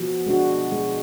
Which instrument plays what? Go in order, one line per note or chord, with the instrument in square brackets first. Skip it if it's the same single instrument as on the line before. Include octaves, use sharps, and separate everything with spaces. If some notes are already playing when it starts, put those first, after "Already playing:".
Already playing: [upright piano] B2 [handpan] F3
[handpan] G#3 D4 F#4
G#3